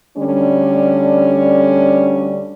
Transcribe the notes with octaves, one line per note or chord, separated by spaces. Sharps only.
D2 D3 G3 C#4 D4